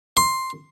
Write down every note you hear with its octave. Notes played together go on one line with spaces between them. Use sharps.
C6